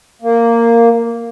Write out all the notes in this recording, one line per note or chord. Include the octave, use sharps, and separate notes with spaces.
A#3